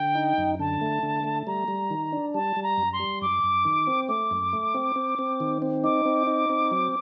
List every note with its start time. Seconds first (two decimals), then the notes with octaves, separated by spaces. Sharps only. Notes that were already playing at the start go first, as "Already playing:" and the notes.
Already playing: D3 G5
0.15 D#4
0.38 F#2
0.59 D3 A5
0.81 A3
1.03 D3
1.24 A3
1.47 G3 A#5
1.68 G3
1.90 D#3
2.12 D4
2.34 G3 A5
2.56 G3
2.63 A#5
2.78 F#2
2.93 C6
3.00 G3
3.22 F#2 D6
3.44 F#2
3.65 D#3
3.87 C4
4.08 A3 D6
4.31 F#2
4.53 A3
4.74 C4
4.96 C4
5.19 C4
5.40 D#3
5.62 C4
5.84 D#4 D6
6.06 C4
6.27 D#4
6.50 C4
6.71 F#3